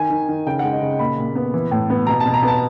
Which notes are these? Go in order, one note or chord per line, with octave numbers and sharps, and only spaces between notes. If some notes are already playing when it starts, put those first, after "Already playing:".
Already playing: D#3 G#5
D#3
D#3
C#3 G5
G#3 F#5
D#5
C#3
A#2 B5
A#2
B3
E3
A2
B3
B2 A#5
A5
B2
A#5
B3 A5